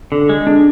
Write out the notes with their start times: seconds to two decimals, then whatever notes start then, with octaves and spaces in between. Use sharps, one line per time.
0.12 D3
0.29 G#3
0.47 D4